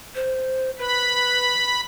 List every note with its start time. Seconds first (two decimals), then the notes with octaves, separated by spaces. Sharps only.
0.15 C5
0.79 B4 B5